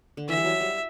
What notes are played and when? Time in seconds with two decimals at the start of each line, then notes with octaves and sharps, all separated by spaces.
0.17 D3
0.29 E3 E5
0.37 G3
0.44 F#3
0.61 G3